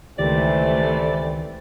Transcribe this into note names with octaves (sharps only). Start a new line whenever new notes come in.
C#2 C3 D#3 E3 A3 G4 D5